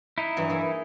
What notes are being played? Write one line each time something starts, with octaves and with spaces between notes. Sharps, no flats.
D#4 E4
G2 E3 F#3
A#3 G#4 E5